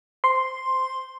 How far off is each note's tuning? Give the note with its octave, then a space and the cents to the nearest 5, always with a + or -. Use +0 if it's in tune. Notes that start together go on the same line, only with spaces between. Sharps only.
C5 -15 C6 +0